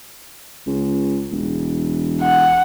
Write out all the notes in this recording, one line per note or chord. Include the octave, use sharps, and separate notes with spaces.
C#2
E1
F#5